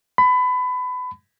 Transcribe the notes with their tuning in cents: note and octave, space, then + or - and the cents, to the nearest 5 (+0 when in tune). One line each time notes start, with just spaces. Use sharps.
B5 +25